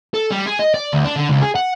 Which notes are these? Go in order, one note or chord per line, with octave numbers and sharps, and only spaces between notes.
A4
G3
G#4
D#5
D5
D2
D4
D3
C#2
G#4
F#5